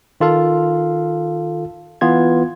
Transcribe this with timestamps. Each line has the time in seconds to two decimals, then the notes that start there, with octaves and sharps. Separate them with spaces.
0.21 D#3 F4 A4 F5
2.01 E3 B3 F4 G#6